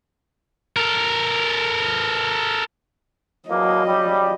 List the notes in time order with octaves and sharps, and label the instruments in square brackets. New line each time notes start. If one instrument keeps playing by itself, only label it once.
[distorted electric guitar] A4 A#4
[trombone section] E2 B2 A#3 [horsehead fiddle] F#3 D#5
[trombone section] C#3 G3